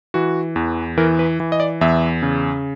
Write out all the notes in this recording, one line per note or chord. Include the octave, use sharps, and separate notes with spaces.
E3 F#4
E2
E3 A#4
B4
E3
D#5
D5
E2 E5
C#3